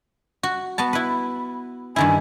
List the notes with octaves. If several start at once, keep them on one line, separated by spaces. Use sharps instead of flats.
F#4
B3 F#4 A5 B5
E4 B4
G2 D#3 E4 G#5